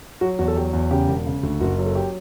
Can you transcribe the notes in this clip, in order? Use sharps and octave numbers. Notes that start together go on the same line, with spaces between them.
F#3 F#4
E2 F#4
A4
F#3 G4
E2
C#3 G4
E1
C#3
D2
F#1 F#4
F#3
A4
G4